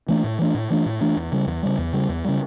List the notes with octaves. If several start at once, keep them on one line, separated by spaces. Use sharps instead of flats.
E3 A3 D4
A2
E3 A3 D4
A2
E3 A3 D4
A2
E3 A3 D4
E2
C#3 G3
E2
C#3 G3
E2
C#3 G3
E2
C#3 G3